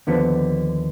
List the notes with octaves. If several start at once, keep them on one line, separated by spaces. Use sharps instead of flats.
D#2 D3 F3 B3